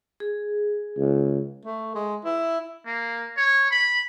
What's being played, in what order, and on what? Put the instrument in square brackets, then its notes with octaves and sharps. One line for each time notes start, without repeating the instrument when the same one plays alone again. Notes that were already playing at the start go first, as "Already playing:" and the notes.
[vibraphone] G#4
[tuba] C#2
[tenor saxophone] A3
G#3
E4
[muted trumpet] A#3
C#5
B5